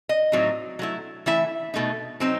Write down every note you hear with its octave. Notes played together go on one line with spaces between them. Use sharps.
D#5
A2 F#3 C4 D#4
F#3 A3 E4
E3 A3 E4 E5
B2 A3 D#4
F#3 C4 D#4